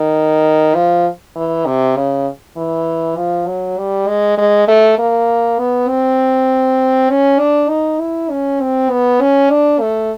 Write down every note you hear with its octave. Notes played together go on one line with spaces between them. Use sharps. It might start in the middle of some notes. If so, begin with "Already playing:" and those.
Already playing: D#3
F3
E3
C3
C#3
E3
F3
F#3
G3
G#3
G#3
A3
A#3
B3
C4
C#4
D4
D#4
E4
C#4
C4
B3
C#4
D4
A3